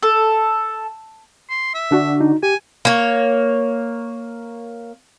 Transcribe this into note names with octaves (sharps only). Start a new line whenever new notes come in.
A4
C6
E5
D3 D4 F#4
D#4
G4 G#5
A#3 C#5